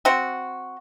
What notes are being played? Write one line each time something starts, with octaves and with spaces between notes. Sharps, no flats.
C4 F#4